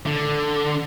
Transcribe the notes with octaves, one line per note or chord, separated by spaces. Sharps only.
D3